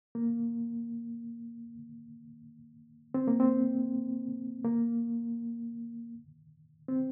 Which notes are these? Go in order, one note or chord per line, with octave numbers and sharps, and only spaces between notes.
A#3
C4
A#3
C4
A#3
C4